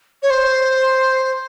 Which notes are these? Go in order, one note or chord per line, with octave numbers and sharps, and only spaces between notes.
C#5
C5